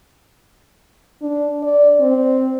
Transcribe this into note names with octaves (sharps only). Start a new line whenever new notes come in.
D4
D5
C4